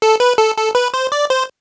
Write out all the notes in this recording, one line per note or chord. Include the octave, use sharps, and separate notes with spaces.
A4
B4
A4
A4
B4
C5
D5
C5